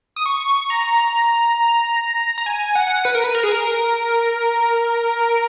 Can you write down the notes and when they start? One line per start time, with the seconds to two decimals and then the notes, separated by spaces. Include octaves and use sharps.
0.16 D#6
0.26 C#6
0.70 A#5
2.38 A#5
2.46 G#5
2.75 F#5
3.05 B4
3.15 A#4
3.24 B4
3.35 A#4
3.44 G#4
3.52 A#4